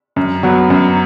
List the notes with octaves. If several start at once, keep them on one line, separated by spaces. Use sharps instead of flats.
F#2
F#3 B3 F#4
F#2